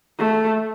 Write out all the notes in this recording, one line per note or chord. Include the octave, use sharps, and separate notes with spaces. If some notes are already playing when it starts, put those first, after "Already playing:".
A3